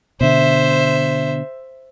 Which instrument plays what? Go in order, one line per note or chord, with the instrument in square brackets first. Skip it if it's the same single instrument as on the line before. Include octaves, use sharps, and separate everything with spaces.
[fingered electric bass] B2 D3 [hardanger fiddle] C5 E5